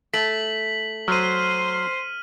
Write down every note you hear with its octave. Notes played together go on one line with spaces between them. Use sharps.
A3 B6 F#7
F#3 C5 C6 F6 D#7